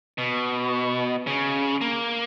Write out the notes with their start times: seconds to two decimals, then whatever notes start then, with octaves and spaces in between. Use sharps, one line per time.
0.18 B2
1.27 C#3
1.81 A#3